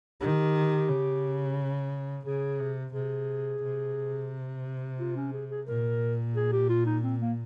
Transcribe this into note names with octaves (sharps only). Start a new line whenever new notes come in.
D#3 G4
C#3
C#3 G#4
C3
C3 G#4
C3
F4
C#4
G#4
G#4
A#2 A#4
G#4
G4
F4
D#4
C4
A#3